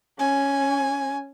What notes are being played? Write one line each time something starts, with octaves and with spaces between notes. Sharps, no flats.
C#4 G#5